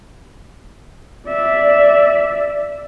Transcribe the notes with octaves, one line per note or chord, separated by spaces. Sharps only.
D5 E5